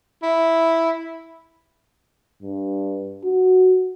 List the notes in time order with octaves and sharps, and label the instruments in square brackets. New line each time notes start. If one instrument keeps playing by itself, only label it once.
[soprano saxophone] E4
[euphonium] G2
F#4